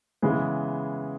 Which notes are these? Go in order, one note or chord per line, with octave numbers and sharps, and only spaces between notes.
C#3 E3 G#3 B3